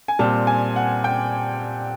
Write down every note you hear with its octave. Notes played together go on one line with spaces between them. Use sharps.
G#5
A#2 G3 C4 A5
G#5
F#5
G5